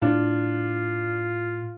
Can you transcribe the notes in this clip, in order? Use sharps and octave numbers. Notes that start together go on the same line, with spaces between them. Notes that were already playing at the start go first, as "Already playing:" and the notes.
A2 D4 F4